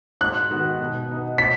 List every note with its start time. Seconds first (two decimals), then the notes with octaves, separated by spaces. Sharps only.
0.21 G#2 F#6
0.51 D#3 B3 D#4 F#4
0.80 B2
1.09 B3 D#4
1.38 B6